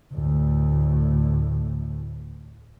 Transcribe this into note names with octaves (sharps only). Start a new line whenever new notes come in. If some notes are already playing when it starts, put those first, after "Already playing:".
D2 A2